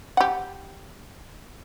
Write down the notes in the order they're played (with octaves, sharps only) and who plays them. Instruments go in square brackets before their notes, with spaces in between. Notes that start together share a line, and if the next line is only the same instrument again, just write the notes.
[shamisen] G4 F#5